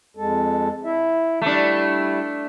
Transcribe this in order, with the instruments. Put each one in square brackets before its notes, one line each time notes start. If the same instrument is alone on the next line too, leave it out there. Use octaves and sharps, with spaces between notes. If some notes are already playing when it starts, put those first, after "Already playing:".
[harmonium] F2 G#3 A4
E4 E5
[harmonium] G3 E4 [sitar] A3 D4